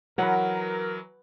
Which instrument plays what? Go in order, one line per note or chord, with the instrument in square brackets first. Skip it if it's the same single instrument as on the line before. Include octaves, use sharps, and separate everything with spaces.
[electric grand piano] E3 F#3 [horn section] A#4 [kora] B4 F#5